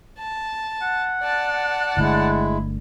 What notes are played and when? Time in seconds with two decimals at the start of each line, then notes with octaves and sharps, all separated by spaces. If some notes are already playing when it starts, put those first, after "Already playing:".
0.18 A5
0.82 F#5
1.22 D5 A5
1.97 G1 D3 G#3 A3 E4